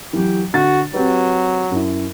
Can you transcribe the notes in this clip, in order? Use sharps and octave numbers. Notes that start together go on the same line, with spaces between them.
E3 F#3 G4
D3 F#4 A6
F#3 C4 G4 B4
F#2 E4